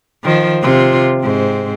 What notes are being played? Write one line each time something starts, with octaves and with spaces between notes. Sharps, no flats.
D#3 F3
C3 F4
G#2 C4